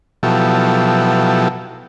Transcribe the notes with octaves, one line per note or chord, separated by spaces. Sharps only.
B2 F3 F#3 E4 G4 A4